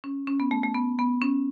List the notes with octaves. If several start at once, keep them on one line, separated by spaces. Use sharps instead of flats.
C#4
C#4
B3
A3
A3
B3
B3
C#4